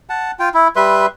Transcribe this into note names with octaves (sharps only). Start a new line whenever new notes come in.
F#5 A5
F4 G5
E4
G3 B4 E5 C6